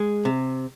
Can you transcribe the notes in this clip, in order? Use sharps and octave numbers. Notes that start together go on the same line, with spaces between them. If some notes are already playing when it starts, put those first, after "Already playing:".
Already playing: G#3
C3